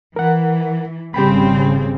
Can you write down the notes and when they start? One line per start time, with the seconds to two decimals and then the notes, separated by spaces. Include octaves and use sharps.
0.16 E3 A#4 F#5
1.14 G#1 C#3 G3 C4 G4 G5 B5